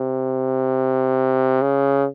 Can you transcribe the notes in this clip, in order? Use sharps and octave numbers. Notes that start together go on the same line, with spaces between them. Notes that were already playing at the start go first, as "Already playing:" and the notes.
Already playing: C3
C#3